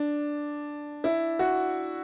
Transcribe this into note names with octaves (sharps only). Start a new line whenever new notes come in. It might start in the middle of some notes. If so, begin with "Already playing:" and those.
Already playing: D4
E4
F#4